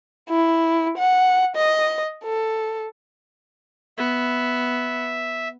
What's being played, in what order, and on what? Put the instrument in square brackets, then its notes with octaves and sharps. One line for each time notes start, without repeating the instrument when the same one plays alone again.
[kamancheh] E4
F#5
D#5
A4
[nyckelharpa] B3 [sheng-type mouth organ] E5